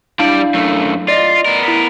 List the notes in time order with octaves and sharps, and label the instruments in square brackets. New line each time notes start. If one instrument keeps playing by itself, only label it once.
[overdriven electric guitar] G3 D5 [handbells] D4 E4 F5
[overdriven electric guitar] F#2 A3
[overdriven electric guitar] F4 [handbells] D5 D#5
[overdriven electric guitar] B3 A#4
[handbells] E4 B6